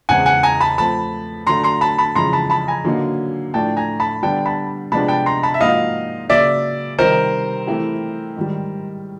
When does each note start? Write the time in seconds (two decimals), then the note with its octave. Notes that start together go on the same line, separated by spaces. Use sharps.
0.09 E2 C#3 E3 G#3 C4 F#5 G#5
0.26 F#5 G#5
0.43 G#5 A#5
0.61 A5 B5
0.78 F3 A3 C4 A5 B5
1.47 D3 F#3 A3 D4 A#5 C6
1.64 A#5 C6
1.81 A5 B5
1.98 A5 B5
2.15 F2 C#3 E3 G#3 A#5 C6
2.33 A5 B5
2.50 A5 B5
2.68 G#5 A#5
2.85 D3 F#3 A#3 D#4
3.54 A2 F3 A3 D4 G5 A5
3.77 G#5 A#5
4.00 A5 B5
4.23 D3 G3 B3 D4 G5 A5
4.46 A5 B5
4.92 C3 F3 G#3 B3 D4 A5 B5
5.08 G5 A5
5.26 A#5 C6
5.43 A5 B5
5.54 E5
5.60 G#2 F3 A#3 D#4 F#4 D#5 F5
6.29 C#3 F#3 A#3 D5 E5
6.98 C3 D#3 G3 C4 D#4 A#4 C5
7.67 E3 A3 C4 E4 G4
8.36 G#2 D#3 G3